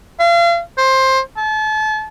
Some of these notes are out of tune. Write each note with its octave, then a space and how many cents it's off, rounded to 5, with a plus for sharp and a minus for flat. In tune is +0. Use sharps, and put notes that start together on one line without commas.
F5 -35
C5 +15
A5 -35